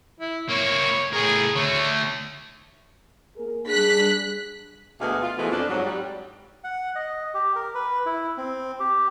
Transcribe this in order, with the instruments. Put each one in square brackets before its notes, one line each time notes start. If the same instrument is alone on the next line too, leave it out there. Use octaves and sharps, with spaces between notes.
[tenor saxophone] E4
[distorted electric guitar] A#3 E4 [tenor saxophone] C#5
[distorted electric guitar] A2 A#4 [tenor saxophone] G#4
[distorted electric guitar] D3 A3 [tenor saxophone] C#5
[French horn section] A#3 G#4 A#4
[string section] G3 F#6 B6 [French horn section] D4 G#4
[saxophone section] D2 B2 G#3 B3 G#4 F5
F4
B2 E3 F3 G#3 A3
F2 D4
G#2 F#3
G3
[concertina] F#5
D#5
G4
A#4
B4
E4
C4
G4